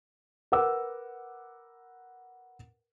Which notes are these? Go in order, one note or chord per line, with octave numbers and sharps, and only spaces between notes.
A#4 B4 F#5 D6 E6